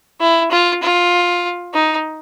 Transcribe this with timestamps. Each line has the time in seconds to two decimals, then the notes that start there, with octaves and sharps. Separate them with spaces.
0.21 E4
0.51 F4
0.82 F4
1.74 D#4